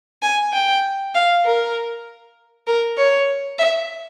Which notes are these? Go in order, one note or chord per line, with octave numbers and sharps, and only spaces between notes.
G#5
G5
F5
A#4
A#4
C#5
E5